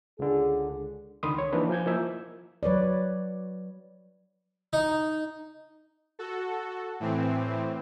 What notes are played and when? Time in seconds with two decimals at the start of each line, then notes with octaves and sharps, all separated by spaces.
0.19 C#2 D3 G#4
1.23 C#2 D3 D#3 B5 C6 D#6
1.38 C#5
1.53 E3 F3 A#3 D4 D#4 B4
1.69 F3 G#5 G6 G#6
1.86 F3 A#3 E4 D#5 E5
2.63 F#3 B4 C#5 D5
4.73 D#4
6.19 F#4 A4
7.00 A2 E3 C4